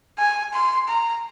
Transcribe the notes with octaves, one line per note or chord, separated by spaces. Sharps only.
G#5
C6
A#5